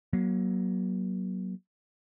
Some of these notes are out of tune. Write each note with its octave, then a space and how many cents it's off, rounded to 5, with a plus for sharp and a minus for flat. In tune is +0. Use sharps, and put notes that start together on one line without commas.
F#3 +15 A#3 +35